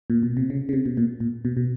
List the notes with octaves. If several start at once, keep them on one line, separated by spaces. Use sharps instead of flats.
A#2
B2
C3
C#3
C#3
C3
B2
A#2
A#2
B2
B2